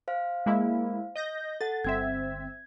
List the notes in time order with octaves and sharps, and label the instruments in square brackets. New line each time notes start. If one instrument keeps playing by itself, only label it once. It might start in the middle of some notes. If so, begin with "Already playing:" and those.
[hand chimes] C5 F5
[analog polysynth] G#3 A#3 E4
D#5 G6 A#6
[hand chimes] A4 F#5 [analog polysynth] A6
[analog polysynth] G1 C4 E5 [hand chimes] G#6